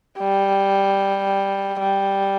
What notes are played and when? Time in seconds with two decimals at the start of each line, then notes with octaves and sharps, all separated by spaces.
0.19 G3
1.79 G3